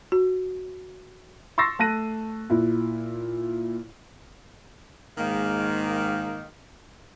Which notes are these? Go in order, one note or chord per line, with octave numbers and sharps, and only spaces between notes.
F#4
C6 C#6 E6 A6 A#6 C7
A3 A5 F#6 A#6 D#7
A#2 E4
G#2 D#3 G#3 A#3